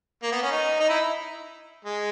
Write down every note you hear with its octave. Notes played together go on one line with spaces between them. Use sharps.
A#3
B3
C#4
D#4
D#4
E4
G#3